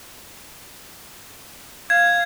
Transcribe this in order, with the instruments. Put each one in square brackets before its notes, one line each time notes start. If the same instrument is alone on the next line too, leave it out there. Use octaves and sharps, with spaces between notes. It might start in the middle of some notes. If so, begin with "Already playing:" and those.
[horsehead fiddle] F5 [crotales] G#6